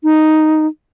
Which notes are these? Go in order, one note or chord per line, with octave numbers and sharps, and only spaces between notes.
D#4